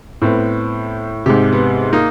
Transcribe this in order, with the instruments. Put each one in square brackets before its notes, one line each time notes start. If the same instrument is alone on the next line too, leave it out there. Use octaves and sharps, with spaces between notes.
[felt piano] A2 [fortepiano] B3 C4
[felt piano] G#2 C3 [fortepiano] G4
[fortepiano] B3
A#3 D#4